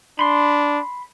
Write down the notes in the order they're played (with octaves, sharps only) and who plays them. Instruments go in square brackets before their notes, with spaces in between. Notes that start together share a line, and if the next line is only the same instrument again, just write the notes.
[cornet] D4 [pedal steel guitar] B5 C6